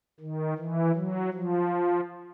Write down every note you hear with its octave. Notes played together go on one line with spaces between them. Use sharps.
D#3
E3
F#3
F3